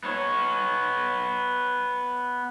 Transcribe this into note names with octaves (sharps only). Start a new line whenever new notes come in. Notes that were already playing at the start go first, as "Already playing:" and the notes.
B3 C#5